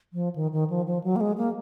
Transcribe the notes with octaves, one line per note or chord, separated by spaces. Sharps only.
F3
D#3
D#3
F3
F3
F#3
A#3
G#3
A#3